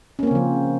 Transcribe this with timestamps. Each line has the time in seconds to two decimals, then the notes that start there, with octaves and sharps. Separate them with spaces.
0.19 C#4
0.23 A#3
0.27 C4
0.31 C#3
0.35 F3